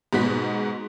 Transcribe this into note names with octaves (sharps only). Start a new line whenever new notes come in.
G#2 B2 B3 F#4 B6